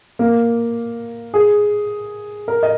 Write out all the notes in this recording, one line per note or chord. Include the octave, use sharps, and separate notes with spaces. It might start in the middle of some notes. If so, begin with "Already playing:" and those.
A#3
G#4
A#4
D#5